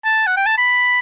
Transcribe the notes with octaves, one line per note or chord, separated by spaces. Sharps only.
A5
F#5
G5
A5
B5